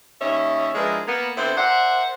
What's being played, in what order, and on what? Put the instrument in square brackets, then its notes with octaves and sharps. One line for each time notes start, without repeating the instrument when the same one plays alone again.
[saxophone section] D#2 C#4 D#5 E5
F3 G#3 D4 E4 A#4 B4
A#3 B3
D3 B3 C4 E4 C5
A#4 C5 D5 E5 F#5